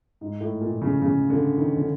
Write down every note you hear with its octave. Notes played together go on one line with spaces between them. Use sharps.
G#2
A2
A#2
C#3
C#3
D3
D#3
D3